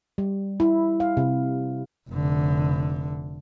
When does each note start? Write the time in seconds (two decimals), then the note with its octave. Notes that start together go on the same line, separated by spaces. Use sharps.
0.18 G3
0.60 E4
1.00 F5
1.17 C3
2.10 F1 D3